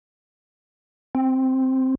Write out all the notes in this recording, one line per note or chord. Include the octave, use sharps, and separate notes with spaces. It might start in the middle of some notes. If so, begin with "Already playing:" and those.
C4